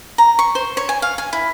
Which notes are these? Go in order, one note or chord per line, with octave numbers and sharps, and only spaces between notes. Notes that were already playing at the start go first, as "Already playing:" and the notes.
A#5
C#6
C5
C#5
G#5
F5
G#5
E4